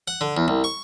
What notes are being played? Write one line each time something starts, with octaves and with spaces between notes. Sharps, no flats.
F#5
D3
E2
C2
C#6